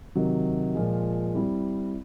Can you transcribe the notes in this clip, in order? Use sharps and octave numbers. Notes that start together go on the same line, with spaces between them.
C3 D#3 F#3
A#2 F3 G#3
G3 C4 E4